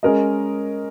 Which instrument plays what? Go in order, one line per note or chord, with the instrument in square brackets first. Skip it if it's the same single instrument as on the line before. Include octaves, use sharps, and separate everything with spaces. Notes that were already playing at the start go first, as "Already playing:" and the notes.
[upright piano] G#3 C#4 A#4 D#5